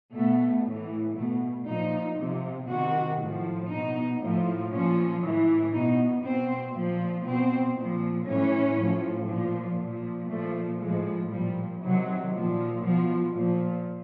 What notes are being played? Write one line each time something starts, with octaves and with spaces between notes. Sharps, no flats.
B2 A3
A2 E3
B2 A3
A#2 F3 D#4
C3 F3
C3 D#3 F#4
A2 F3
B2 D#4
A2 F3
A#2 F3 C#4
A2 E3
B2 D#4
B2 C4
A#2 F3
B2 C4
A#2 F3
A2 E3 C#4
A2 F3
A#2 F3
A#2 F3
A#2 F3 A3
A2 F3 G#3
A#2 F3 G3
C3 D#3 F#3
A#2 F3
B2 F3
A#2 F3